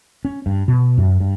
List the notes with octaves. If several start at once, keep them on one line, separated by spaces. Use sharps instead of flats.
C#4
G2
B2
F#2
G2